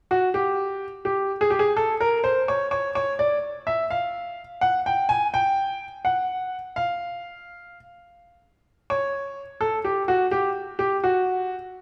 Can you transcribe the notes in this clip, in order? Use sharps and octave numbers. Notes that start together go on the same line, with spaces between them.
F#4
G4
G4
G#4
G4
G#4
A4
A#4
C5
C#5
C#5
C#5
D5
E5
F5
F#5
G5
G#5
G5
F#5
F5
C#5
A4
G4
F#4
G4
G4
F#4